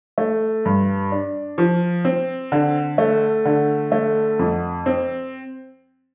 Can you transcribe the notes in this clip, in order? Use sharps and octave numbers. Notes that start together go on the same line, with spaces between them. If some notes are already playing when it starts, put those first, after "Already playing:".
A3
G2
D4
F3
C4
D3
A3
D3
A3
F2
C4